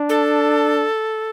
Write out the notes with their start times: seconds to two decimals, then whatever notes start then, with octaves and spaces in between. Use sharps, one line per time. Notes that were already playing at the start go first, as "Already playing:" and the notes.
Already playing: D4
0.09 A4